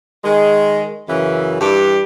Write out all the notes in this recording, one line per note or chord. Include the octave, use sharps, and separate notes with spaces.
D#3 G#3
F#2 C#3 E3
G2 E3 G3 G4